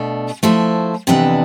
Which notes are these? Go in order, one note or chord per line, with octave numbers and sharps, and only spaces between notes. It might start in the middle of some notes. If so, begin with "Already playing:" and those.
Already playing: B2 A3 D4
F3 A3 E4 A4 C5
F2 C3 E3 B3 D4